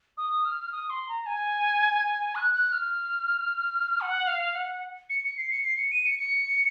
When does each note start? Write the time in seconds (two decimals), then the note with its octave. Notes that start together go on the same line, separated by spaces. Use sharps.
0.17 D#6
0.45 F6
0.72 D#6
0.89 C6
1.08 A#5
1.26 G#5
2.35 F#6
2.54 F#6
2.72 F6
4.01 F#5
4.27 F5
4.54 F#5
5.09 C#7
5.24 C#7
5.37 C7
5.50 C#7
5.64 C7
5.78 C#7
5.91 D#7
6.05 C#7
6.19 C#7